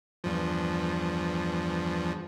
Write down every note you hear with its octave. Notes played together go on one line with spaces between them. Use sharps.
E2 G2 F3